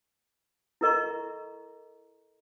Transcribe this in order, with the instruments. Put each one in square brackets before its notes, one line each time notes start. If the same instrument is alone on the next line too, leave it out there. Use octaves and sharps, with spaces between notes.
[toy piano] E4 A4 A#4 D#5 A#5 C#6